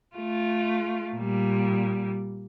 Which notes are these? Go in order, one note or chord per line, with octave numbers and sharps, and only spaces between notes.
A3 F4
A#2 G3